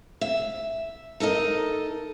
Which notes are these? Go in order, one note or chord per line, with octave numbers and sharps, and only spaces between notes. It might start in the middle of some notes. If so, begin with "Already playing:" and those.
E5
D#4 A4 A#4 D#5